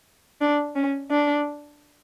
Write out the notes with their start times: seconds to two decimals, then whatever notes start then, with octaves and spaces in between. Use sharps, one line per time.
0.41 D4
0.76 C#4
1.11 D4